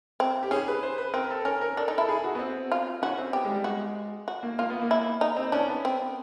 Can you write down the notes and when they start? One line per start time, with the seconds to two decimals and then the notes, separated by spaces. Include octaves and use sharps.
0.20 C4
0.43 G4
0.51 C#4 G#4
0.68 B4
0.83 C5
0.98 B4
1.14 C4 A#4
1.30 A4
1.45 C#4 A#4
1.61 A#4
1.77 D4 A4
1.88 D#4
1.98 E4 A4
2.09 G#4
2.24 F#4
2.35 B3
2.39 C4
2.72 F4
3.02 C#4 F#4
3.18 C4
3.33 B3 G4
3.45 G#3
3.49 G3
3.64 G#3 F#4
4.28 F#4
4.43 A#3
4.59 A#3 F4
4.70 B3
4.82 A#3
4.91 E4
5.21 D#4
5.37 C4
5.52 C#4 D4
5.69 B3
5.85 C4